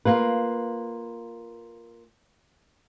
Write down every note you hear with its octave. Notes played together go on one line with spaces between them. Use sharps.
A#3 F4 B4